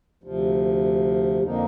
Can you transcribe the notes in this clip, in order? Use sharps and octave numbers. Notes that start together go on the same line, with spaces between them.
D2 C3 F3
F2 D3 F3 A#3 D#4